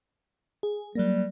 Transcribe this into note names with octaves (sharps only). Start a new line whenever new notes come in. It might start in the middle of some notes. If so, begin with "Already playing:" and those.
G#4
F#3 G3 A#3